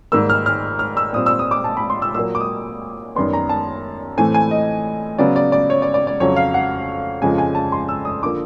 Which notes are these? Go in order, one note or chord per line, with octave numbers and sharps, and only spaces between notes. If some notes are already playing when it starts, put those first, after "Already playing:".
G#2 D#3 G3 A#3 E6
F6
F6
F6
E6
A#2 G3 C4 D#6
E6
D#6
D6
A5
B5
C6
E6
A#2 F#3 A#3 E6
D6
D#6
F#2 D#3 G3 B3 C6
A#5
A5
A2 E3 A3 C4 G#5
G#5
D#5
C#3 F#3 B3 D5
D5
D5
C#5
D5
D5
D5
F2 C#3 F#3 C#5
F5
F#5
F2 C#3 F3 G#3 G#5
G#5
A5
C6
E6
D#6
D3 F3 A#3 D6